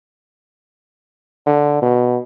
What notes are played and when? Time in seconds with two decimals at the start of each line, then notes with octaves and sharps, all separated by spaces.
1.47 D3
1.82 B2